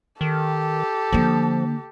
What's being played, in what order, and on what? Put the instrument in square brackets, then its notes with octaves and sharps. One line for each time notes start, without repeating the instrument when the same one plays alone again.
[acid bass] D#3 [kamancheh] G4 A4
[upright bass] D3 A#3 [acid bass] F3